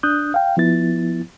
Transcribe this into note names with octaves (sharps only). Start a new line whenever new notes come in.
D4 D#6 F#6 G6
F5 G5
F3 B3 E4 A6